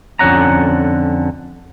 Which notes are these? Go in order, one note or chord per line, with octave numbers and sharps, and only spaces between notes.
F2 D3 C#4 F#5 A#5